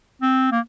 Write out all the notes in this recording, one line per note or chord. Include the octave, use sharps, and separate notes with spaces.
C4
A#3